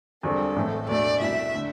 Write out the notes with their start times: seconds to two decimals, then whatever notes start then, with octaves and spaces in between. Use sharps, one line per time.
0.23 E1 E2 D3 G3 C4 A4
0.56 A1 A2 E3 A3 C4
0.89 E2 B2 A3 D4 D5
1.20 C2 B2 A3 E4 E5
1.54 D3 A3